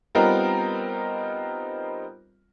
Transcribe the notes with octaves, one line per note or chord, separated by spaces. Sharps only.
G3 B3 C4 D#4 F4 A#4